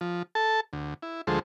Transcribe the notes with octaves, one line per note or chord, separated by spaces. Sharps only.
F3
A4 A5
D2
E4
D2 F3 G#3 A4 C5